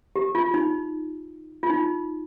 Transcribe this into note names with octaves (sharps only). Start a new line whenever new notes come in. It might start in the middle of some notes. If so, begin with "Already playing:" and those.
G4
F4
D#4
F4
D#4